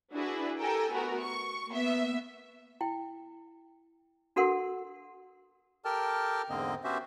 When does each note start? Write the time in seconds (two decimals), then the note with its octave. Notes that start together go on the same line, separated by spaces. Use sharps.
0.12 D4 E4 F#4 G#4 B4
0.59 G4 A4 A#4 G5 G#5
0.92 A3 B3 F#4 A#4
1.22 C#6
1.69 A#3 B3 E5
2.81 E4 G5
4.36 D4 F#4 A4 A#4 F#5 C6
5.85 G4 A4 A#4 G5 A5 F6
6.50 E2 G#2 D3 A#3 C4 D#5
6.84 B3 C#4 F#4 G4 C5 E5